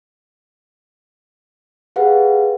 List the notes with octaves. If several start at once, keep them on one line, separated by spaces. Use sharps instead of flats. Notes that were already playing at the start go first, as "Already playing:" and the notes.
G4 G#4 B4 F5 F#5